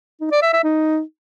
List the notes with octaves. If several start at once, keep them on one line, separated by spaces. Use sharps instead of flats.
D#4
D5
E5
E5
D#4